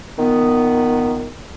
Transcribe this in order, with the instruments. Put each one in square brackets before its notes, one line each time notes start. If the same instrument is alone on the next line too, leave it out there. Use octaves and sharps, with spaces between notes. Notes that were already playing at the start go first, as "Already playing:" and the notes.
[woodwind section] A#2 D#3 B3